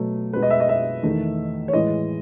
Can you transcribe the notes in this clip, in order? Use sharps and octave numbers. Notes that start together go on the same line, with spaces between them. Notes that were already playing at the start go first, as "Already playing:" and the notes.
Already playing: B2 F#3 A3
B2 G#3 B4
D#5
E5
D#5
E5
E2 D#3 A3
C#5
A2 E3 G#3 D#5